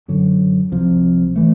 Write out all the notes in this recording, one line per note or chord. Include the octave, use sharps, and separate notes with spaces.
F#2 D3 F#3
C2 C3 F3
E3 A3